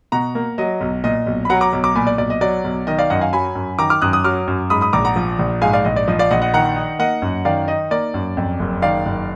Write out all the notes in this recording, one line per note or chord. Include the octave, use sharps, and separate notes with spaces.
B2 F#5 A#5
A#3
F#3 D#5
B1
A#2 D#5
B1
B5
F#3 F#5 A#5
A#5 D6
B1
A#5 D6
A#2 G#5 B5
D5
B1 D5
D#5
F#3 D5
B1
D#3 D#5
D5 F5
F#2 D#5 F#5
F5 G#5
F#3 G#5 B5
F#2
D#3 A#5 D6
D6 F6
F#2 D#6 F#6
D#6 F#6
F#3 D6 F6
F#2
G#2 B5 D#6
B5 D#6
A#1 A#5 D6
F#5 A#5
F3
A#1
G#2 F5 G#5
D5 F5
A#1 D#5
D5
F3 D#5
D5 F5
A#1 D#5 F#5
D#5 F#5
D#3 F#5 A#5
D#4
A#3 D#5 F#5
F#2
D#3 D5 F5
D#4 D#5
A#3 D5
F#2
F2
F#1
D#3 D5 F5
F#1